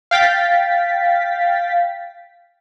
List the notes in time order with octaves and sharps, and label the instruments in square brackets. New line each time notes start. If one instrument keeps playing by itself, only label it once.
[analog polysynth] F5 G5 A6 B6